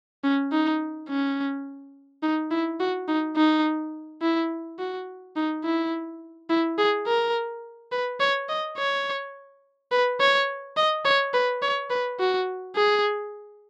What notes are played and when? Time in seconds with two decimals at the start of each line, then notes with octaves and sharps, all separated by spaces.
0.24 C#4
0.52 D#4
1.09 C#4
2.22 D#4
2.51 E4
2.80 F#4
3.08 D#4
3.36 D#4
4.22 E4
4.79 F#4
5.36 D#4
5.64 E4
6.50 E4
6.78 G#4
7.06 A#4
7.92 B4
8.20 C#5
8.49 D#5
8.78 C#5
9.92 B4
10.20 C#5
10.77 D#5
11.05 C#5
11.34 B4
11.62 C#5
11.90 B4
12.19 F#4
12.76 G#4